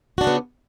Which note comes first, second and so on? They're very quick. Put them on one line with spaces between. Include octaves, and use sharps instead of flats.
F#4 D4 C#3 B3